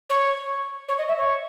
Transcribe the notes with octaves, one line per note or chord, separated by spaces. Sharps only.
C#5
C#5
D#5
E5
C#5